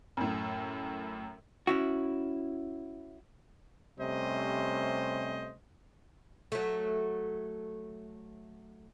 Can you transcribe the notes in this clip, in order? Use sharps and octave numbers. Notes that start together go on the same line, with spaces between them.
F#2 A2
C#4 E4 F#4
C3 G3 A3 C#4 C5 D#5
F#3 A3